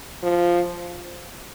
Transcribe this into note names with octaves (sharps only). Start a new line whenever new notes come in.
F3